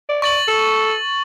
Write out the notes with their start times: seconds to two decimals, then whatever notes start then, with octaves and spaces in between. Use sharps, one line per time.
0.09 D5
0.22 D5 C#6 A6 F#7
0.48 A4